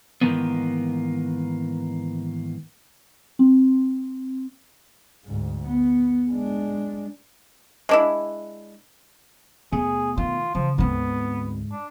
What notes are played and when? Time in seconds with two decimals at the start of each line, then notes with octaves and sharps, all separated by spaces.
0.21 G#2 D#3 E3 A#3 B3
3.39 C4
5.25 D2 G#2
5.67 B3
6.31 G#3 D4
7.89 G#3 D4 E4
9.72 D#2 B2 A3 G#4
10.18 D#3 F4
10.55 C#3 E3 F3
10.78 D2 G#2 B3 C4
11.72 D4